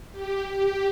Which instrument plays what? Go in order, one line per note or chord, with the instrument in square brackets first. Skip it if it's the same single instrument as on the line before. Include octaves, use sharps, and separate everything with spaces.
[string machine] G4
G4